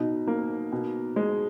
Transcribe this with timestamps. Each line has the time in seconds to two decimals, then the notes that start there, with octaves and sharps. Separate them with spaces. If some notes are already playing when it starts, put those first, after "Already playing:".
Already playing: B2 D#4
0.27 A#3
0.72 B2
1.16 G#3